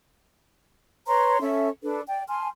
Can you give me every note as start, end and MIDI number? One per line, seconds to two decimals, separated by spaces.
1.07 1.40 71
1.07 1.40 73
1.07 1.40 82
1.07 1.40 84
1.41 1.69 61
1.41 1.69 69
1.41 1.69 76
1.82 2.02 62
1.82 2.02 69
1.82 2.02 71
2.08 2.23 74
2.08 2.23 79
2.28 2.48 80
2.28 2.48 81
2.28 2.48 84
2.28 2.48 89